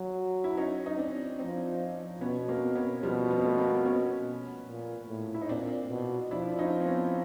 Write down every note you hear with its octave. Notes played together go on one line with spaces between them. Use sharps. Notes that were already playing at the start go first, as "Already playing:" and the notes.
Already playing: F#3
E4
C#4 D#4
D#4
C4 D4
F3 C4 D4
B2 B3 C#4
A#3 C4
B3 C#4
B2 F3 G3
B3
C4
A3 B3
A#3 C4
C4
B3 C#4
A#2
A2
E4
D#4
A#2 C4 D4
B2
F3 D4 E4
D4
C#4 D#4
C4
B3 C#4